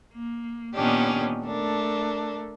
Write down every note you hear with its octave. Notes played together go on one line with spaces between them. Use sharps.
A#3
A#2 D#3 B3 C#4 D4 G4
A3 D4 A#4